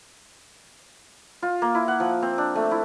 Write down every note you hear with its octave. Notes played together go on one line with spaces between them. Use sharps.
F4
A#3
E4
F#5
F3
C4
D4
A3
E4